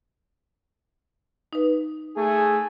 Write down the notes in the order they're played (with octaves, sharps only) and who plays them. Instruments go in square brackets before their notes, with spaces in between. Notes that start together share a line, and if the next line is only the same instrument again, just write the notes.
[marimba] D#4 B4
[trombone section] A3 G#4